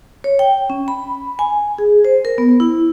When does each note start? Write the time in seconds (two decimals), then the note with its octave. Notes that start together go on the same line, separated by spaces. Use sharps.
0.24 C#5
0.39 G5
0.70 C#4
0.88 B5
1.39 G#5
1.79 G#4
2.05 C5
2.25 A#4
2.38 B3
2.60 E4